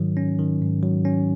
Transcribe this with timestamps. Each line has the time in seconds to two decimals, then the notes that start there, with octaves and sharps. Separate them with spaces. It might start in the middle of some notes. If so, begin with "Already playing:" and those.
Already playing: G#2 D#3 F#3
0.17 C#4
0.39 D#3
0.62 G#2
0.83 F#3
1.05 C#4